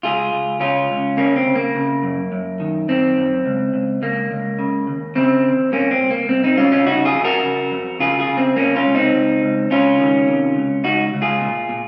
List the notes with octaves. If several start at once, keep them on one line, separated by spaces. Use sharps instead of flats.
C#2 F4 G#4
C#2
C#3 C#4 F4
C#2
C#3 A#3 C#4
C4
C#3
A#3
C#3
F#2
F#2
D#3
F#2 C4
F#2
C#2
C#2
C#2 A#3
C#2
C#3
D#2
C#3 C4
D#2
A#2 A#3 C#4
C4
C2
A#3
C2 C4
C4 D#4
C2 C#4 F4
C#4 F4
C#3 D#4 F#4
F4 G#4
F2
F#4 A#4
C#3
F2
C#3 F4 G#4
F4 G#4
C#3
C4
C#3 A#3 C#4
C#4 F4
C#2
C4 D#4
C#2
C#2
C#2 C#4 F4
D#3
C3
C#2
C#2 D#4 F#4
C#2
F4 G#4
A#2
A#2